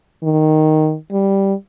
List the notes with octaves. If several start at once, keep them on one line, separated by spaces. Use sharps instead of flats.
D#3
G3